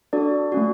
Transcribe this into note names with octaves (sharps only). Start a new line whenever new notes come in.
D4 F#4 A4 D5
A3 C#4 F#4